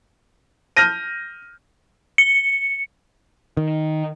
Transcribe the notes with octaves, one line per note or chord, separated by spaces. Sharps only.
F6 G6 A#6 D#7
C#7
D#3